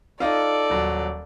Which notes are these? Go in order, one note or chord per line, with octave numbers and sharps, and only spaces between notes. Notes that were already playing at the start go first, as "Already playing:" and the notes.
D#4 F4 A4 D5
D#1 F#3